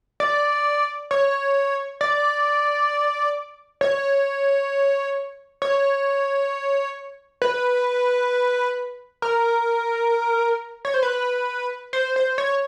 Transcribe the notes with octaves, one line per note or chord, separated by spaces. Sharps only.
D5
C#5
D5
C#5
C#5
B4
A#4
C#5
C5
B4
C5
C5
C#5